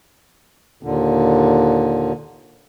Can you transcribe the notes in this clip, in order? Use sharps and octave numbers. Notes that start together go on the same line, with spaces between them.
D#2 A#2 D3